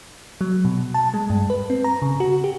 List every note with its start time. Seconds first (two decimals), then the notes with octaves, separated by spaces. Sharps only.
0.41 F#3
0.65 B2
0.94 A5
1.14 G#3
1.30 G2
1.50 B4
1.70 C4
1.84 A#5
2.02 C#3
2.20 F#4
2.44 G4